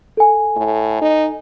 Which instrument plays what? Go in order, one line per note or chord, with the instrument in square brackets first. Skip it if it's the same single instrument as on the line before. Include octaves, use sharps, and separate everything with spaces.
[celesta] A4 G#5
[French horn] A2
D#4